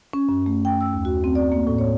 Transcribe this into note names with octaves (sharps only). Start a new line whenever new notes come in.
C#4
F#2
A3
G5
E6
D#2
F#4
C4
D5
A#3
A2
C#5